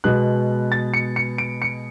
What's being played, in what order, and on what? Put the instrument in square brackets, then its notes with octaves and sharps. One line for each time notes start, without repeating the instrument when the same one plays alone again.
[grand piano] B2 G#3 B3 F#6
A6
C#7
C#7
D7
C#7